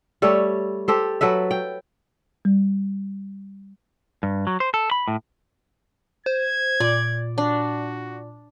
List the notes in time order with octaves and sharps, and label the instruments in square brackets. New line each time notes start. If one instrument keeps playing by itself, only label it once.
[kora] G3 A3 A4 C#5
G4 A4 C5
F#3 A4 B4 E5
G5
[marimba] G3
[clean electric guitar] G2
F#3
C5
A4
B5
A2
[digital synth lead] C5 [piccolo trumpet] G#6
[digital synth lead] A#2 [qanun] D5
[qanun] D4 [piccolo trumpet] F#4